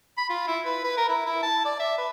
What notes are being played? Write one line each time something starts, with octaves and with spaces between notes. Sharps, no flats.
B5
F4
E4
B4
B4
A#4
E4
E4
A5
D5
E5
B4